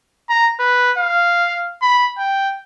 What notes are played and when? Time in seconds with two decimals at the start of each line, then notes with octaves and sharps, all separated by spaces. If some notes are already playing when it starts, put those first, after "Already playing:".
0.29 A#5
0.59 B4
0.98 F5
1.82 B5
2.18 G5